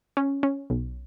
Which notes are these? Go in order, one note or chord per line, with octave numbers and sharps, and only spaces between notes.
C#4
C#4
B1